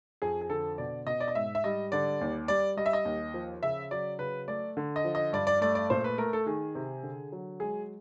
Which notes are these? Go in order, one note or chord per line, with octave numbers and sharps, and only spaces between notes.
F2 G#4
G#4
D3 A4
B2 D5
B2 D#5
D5
D#5
G#2 E5
E5
G3 D#5
D3 D5
D#2
G3 D5
G3 D#5
E5
D#5
D#2
F3
C#3 E5
F#3 D5
C#3 B4
A3 D5
D3
D#5
F3
D#5
G2 D5
D5
A3 D5
D5
A#2 C5
B4
A3 A#4
A4
D#3 G#4
C3
D3
F#3
G#3 G#4